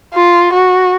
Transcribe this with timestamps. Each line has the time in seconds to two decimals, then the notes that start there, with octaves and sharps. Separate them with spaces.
0.14 F4
0.53 F#4